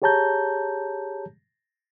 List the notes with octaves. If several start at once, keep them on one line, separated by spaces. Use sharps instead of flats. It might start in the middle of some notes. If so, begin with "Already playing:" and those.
G4 G#4 C#5 A5 A#5 G6